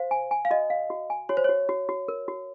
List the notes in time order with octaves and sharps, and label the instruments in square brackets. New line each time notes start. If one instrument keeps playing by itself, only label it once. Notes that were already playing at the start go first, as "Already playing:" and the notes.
Already playing: [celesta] C5 [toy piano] F5
[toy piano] G#5
G#5
[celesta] F5
[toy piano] F#4 [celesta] D#5
[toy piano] F5
F#4
G#5
[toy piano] F#4 [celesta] C#5
[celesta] C5
[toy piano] F#4 [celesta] C#5
[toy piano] F#4
F#4
A#4
F#4